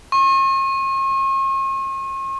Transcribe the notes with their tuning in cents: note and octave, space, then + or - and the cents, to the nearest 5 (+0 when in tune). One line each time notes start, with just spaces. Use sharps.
C#6 -45